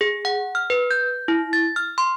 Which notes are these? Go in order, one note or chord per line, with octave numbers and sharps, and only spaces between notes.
G#4
F#5
F6
B4
G6
E4
A6
F6
C6